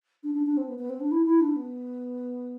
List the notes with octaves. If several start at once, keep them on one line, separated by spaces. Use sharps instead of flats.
D4
D4
D4
C4
B3
B3
C4
D4
E4
E4
D4
B3